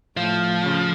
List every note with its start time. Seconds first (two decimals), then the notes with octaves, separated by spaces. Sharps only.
0.17 A2 F3
0.62 C#3